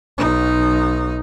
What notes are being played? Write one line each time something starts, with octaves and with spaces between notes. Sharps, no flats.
B1 D#4